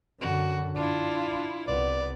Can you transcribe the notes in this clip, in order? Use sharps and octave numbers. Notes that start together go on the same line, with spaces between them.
F#2 D3 F#4
D4 E4 F4
C2 B3 D5